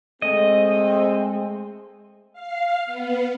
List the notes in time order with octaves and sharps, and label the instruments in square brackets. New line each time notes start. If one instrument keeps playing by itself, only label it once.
[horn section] G#3 A3 C4 [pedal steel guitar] D#5
[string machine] F5
B3